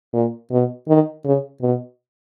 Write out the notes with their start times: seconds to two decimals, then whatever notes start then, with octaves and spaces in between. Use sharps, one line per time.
0.13 A#2
0.51 B2
0.88 D#3
1.25 C#3
1.61 B2